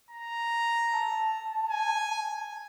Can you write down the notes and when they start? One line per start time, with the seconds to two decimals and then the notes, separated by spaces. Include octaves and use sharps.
0.11 A#5
0.92 A5
1.69 G#5